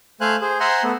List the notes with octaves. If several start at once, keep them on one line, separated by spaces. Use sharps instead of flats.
A3 C5 F5 G#5 F#6
G#4 C5
C5 E5 F#5 G#5 A#5 C6
A3 B3